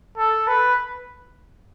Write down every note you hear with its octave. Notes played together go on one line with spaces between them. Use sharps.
A4
B4